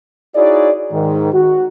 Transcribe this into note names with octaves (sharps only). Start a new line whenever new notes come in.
D#4 E4 F#4 G#4 C#5 D5
G#2 D#3
F#4